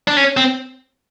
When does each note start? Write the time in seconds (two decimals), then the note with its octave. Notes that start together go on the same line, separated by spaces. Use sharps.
0.08 D4
0.17 C#4
0.37 C4